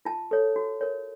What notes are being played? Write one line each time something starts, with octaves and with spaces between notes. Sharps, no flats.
F4 A5
A4 C#5
F#4
A#4 C#5